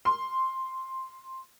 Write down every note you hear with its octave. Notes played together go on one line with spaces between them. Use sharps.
C6